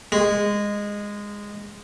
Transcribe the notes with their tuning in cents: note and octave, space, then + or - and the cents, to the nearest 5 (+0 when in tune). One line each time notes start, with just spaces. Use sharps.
G#3 -15